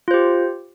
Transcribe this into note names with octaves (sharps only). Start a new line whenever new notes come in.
F4 G4 C5